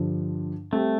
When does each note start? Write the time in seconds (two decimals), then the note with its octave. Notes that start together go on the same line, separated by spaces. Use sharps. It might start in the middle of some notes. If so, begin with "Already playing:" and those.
Already playing: G2 D3 F3
0.72 G3 A3 C4